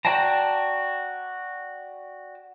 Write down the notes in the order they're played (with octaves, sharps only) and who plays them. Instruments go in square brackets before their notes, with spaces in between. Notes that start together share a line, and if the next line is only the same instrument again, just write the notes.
[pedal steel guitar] F#4 D5 G5 A5 A#5